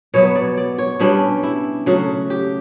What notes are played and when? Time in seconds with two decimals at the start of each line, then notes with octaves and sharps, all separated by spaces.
0.14 B2 F#3 B3 C#5
0.36 D5
0.57 D5
0.78 C#5
1.00 B2 G3 C#4 D4
1.43 E4
1.86 C#3 F#3 A3 F#4
2.30 G4